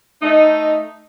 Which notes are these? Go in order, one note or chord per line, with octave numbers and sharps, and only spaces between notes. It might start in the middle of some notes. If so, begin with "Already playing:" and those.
A3 D#4